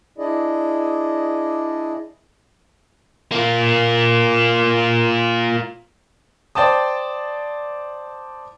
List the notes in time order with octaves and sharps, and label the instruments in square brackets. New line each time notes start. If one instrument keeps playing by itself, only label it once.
[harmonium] D4 E4 G#4 D5 D#5
[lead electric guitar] A#3 F4
[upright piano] C5 D5 G5 A5 D#6